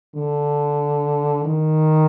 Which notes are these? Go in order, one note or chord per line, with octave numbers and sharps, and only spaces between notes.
D3
D#3